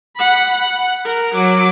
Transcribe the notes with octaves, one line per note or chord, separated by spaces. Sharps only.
F#5 B5
F#5
A#4
F#3 D6